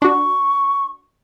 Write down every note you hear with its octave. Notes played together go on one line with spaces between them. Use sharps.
D4 F#4 C#6